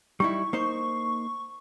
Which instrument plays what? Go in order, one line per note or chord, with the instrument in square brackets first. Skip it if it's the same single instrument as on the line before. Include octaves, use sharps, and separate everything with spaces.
[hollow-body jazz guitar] G3 D#4 E4 [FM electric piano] C#6
[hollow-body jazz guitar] A#3 D#4 C5